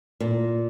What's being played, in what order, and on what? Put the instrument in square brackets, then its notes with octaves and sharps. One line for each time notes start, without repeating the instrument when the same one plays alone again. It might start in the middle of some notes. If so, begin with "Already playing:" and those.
[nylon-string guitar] A#2